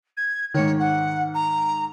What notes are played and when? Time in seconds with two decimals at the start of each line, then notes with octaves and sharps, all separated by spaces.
0.17 G#6
0.54 G#2 D#3 C#5
0.80 F#5
1.34 A#5